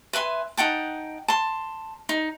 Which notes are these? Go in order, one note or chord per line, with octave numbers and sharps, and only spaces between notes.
B4 E5 G#5 C6
D#4 F#5 G5 A5
A5 C6
D#4